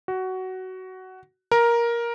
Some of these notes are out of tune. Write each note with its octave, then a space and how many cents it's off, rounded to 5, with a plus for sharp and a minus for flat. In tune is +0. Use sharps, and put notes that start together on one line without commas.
F#4 +15
A#4 +10